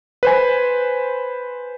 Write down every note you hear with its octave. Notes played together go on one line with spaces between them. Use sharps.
B4 C5 G#5